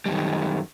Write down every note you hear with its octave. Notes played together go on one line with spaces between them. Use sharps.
F#2 D#3 G3